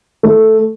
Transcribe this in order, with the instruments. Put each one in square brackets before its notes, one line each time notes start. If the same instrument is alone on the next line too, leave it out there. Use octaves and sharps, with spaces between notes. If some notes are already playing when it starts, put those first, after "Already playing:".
[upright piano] A3